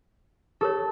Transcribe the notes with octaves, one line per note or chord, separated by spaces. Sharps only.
G4 A4 A#4 C#5